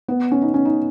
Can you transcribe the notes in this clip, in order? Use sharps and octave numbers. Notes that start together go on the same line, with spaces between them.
B3
C#4
D#4
C#4
D#4